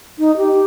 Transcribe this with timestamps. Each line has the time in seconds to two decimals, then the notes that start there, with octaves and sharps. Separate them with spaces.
0.19 D#4
0.37 G4